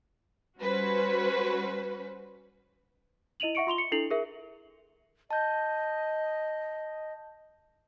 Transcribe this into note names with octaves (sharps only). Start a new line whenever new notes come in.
G3 C#4 F#4 B4 C5
E4 D#5 D#7 F7 F#7
E5 F#5 C#6 C#7 D7
F4 C6 F7 G7
C#7
D4 E4 A4 C7 F7 F#7
G#4 A#4 E5
D#5 A5 G6